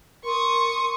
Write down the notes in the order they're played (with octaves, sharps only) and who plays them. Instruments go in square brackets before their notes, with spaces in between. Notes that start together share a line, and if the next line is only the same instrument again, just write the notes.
[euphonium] A#4 [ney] C6 [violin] C#6 D#6